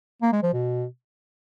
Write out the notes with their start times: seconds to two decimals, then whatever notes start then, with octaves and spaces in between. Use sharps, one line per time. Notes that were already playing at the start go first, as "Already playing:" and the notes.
0.22 A#3
0.33 G#3
0.43 F3
0.53 B2